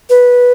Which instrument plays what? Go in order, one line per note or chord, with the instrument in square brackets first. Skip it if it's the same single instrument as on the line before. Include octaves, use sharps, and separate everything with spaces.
[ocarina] B4